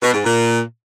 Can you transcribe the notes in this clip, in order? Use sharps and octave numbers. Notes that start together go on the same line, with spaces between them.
B2
G#2
A#2